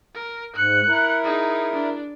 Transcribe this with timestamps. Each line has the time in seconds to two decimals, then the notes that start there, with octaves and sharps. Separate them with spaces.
0.15 A#4
0.56 G#2 F#6 C#7
0.87 E4 A#4
1.24 D#4 G#4
1.74 D4